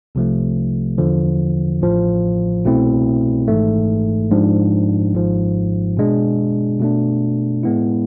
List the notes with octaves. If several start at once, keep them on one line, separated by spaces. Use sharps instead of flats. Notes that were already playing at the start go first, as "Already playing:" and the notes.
C2 C3 F3 A3
E2 D3 F3
A1 A2 F3
C2 B2 A3 C4 E4
G#1 G#2 E3 A3
G#2 F3 G#3 D4
G#1 G#2 F3
B2 G#3 D4
B2 A3 D4
A2 G#3 B3 E4